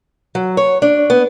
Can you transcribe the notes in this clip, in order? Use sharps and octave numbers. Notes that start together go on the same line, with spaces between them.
F#3
C#5
D4
B3